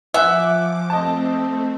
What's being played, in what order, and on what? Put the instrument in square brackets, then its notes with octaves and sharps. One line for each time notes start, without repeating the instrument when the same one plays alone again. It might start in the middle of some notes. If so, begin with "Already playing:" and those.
[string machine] F3 D6 [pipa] E5 [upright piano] F#5 G#5 F#6
[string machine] A3 C4 [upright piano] D#5 A5